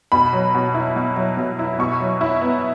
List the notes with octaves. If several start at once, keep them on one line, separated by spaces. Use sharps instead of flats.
B2 B5
F#3
B2
E4
B2
F#3
B2
E4
B2 C#6
F#3
E4
B3